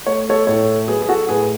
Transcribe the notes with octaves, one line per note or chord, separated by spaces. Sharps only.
A3 C#5
A4 C#5
A2 A4 C#5
F#3 G#4 B4
G#4
F#4 A4
A2 G#4 B4